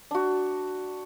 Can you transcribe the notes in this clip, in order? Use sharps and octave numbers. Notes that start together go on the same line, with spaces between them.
D4 F#4